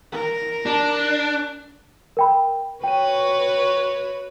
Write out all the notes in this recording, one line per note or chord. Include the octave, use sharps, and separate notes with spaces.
A#4
D4
A#4 G5 B5
F#4 B4 C#5 G5 D#7